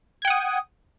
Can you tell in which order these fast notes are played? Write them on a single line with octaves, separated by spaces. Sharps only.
G#6 G5 F#5 D#6